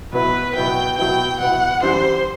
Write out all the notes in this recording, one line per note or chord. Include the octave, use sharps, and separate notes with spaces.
B2 F#3 B3 E4 B4
B2 F#3 B3 E4 G5
B2 F#3 B3 E4 G5
B2 F#3 B3 E4 F#5
F#2 E3 G3 C5